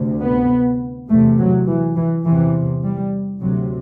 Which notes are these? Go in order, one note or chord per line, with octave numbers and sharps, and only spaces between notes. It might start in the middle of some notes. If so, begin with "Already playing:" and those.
Already playing: D2 C3
B3
E2 C3 A3
F#3
E3
E3
E2 C3 E3
G3
D2 C3 F#3